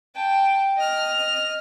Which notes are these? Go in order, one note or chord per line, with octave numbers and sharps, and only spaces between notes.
G5 A5
D#5 F6